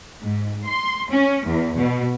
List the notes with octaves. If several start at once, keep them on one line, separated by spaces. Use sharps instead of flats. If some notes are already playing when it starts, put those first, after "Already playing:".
G#2
C6
C#4
E2
B2